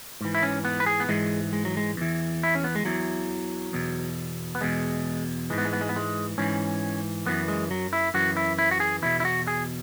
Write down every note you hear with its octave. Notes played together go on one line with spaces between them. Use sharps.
G#2 E3
E4
C#4
B3
B4
G#4
B3
G#2 E3 G#3
G#3
F#3
G#3
E2 E3
E4
C#4
B3
G#3
E2 E3 F#3
E2 B2
B3
E2 B2 G#3
G#2 E3 G#3
B3
G#3
B3
G#3
B3
G#3
G#2 E3 C#4
F#2 E3 B3
G#3
F#3
E4
F#2 E3 F#4
E4
E4
F#4
G#4
E2 B2 E4
E4
F#4
G#4